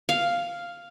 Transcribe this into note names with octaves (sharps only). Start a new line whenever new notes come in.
F5